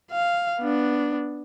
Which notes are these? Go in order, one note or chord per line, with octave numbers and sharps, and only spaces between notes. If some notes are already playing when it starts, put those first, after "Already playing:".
F5
B3 D4